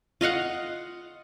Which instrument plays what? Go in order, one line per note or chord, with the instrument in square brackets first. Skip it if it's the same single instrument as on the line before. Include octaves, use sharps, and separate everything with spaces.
[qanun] F4 D#5 F5 F#5